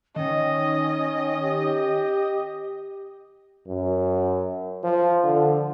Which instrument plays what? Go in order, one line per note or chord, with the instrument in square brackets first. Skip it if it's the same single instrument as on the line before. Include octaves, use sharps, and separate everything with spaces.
[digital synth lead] D#3 [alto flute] C#4 [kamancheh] D#5
[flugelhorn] G4
[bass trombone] F#2
F3
D3